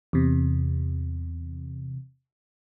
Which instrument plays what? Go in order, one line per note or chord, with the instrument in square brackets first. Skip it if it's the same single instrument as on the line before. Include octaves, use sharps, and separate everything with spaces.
[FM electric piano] E2 C3